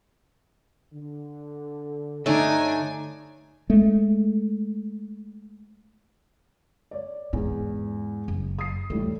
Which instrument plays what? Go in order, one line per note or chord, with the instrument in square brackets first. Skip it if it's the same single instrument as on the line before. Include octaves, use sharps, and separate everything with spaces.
[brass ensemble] D3
[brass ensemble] G2 A#5 [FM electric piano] D3 C#5 [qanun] A3 D#4 [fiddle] D4 G#5
[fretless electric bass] G#3 A3
[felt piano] C#5 D5
[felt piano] E2 [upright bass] G#2
[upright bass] F#1
[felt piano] D#6 C7
[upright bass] E2 [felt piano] A2 G3 A3